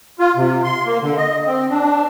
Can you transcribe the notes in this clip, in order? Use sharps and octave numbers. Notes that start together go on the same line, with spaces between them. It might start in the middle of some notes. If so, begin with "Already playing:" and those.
F4
C3
C6
A#3
D3
D#5
C4
D4